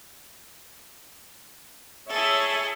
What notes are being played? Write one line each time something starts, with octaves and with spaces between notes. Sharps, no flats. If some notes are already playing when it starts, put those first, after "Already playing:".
E4 G#4 A4 C#5 E5